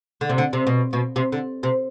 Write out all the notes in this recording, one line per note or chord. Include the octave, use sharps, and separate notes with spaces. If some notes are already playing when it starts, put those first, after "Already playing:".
D3
C3
D3
C3
B2
B2
C3
D3
C3